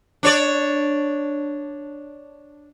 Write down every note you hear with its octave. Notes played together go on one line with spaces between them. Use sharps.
D4 C#5 D5